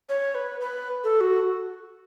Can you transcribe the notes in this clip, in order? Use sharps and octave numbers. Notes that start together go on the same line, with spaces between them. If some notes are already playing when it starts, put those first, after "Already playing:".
C#5
B4
B4
A4
F#4